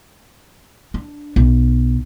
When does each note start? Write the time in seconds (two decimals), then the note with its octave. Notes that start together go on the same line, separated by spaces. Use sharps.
0.94 D4
1.36 B1